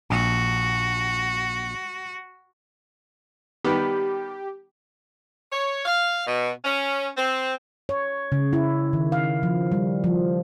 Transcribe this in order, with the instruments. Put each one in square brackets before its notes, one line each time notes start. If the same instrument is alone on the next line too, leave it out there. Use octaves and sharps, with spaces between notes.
[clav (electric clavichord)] A#1 [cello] F#4
[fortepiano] D#3 G3 B3 [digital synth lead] G4
[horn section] C#5
F5
B2
C#4
C4
[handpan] C#5
C#3
E4
D#3
F5
F3
G3
F3